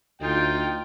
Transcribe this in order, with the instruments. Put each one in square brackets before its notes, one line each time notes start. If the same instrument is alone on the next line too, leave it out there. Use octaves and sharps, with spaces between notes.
[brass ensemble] D2 G5 [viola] D#4 F4